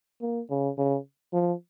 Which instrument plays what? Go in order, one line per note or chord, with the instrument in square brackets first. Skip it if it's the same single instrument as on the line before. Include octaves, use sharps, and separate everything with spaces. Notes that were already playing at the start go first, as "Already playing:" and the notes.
[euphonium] A#3
C#3
C#3
F3